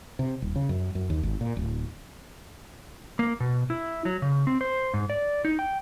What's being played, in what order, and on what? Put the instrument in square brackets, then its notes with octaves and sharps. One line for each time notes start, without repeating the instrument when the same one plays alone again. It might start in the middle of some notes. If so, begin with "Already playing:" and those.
[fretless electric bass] C3
D#1
C#3
F#2
F#2
D#2
G#1
A#2
D1
[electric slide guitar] A#3
B2
E4
F#3
C#3
C4
C5
G#2
D5
D#4
G5